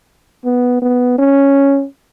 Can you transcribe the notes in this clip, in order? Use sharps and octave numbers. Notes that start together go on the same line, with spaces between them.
B3
B3
C#4